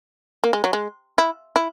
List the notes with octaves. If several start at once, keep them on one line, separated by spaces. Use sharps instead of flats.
A#3
G#3
F#3
G#3
E4
E4